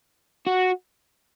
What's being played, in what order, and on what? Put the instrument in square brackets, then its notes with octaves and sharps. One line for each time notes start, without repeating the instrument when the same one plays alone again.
[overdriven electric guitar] F#4